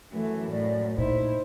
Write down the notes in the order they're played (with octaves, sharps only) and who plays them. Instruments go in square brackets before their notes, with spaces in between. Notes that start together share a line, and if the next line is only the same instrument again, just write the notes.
[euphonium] F#2 [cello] E3 [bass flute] A3
[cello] A2 [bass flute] D5
[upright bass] A#2 [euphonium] D#4 [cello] E4 [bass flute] C5